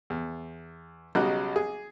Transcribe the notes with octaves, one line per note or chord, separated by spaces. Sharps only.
E2
B1 C#3 F#3 G3 D#5 F#6
G#4